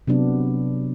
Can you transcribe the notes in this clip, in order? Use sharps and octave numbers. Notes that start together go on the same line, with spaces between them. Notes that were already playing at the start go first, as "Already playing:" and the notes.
C3 F#3 B3 D4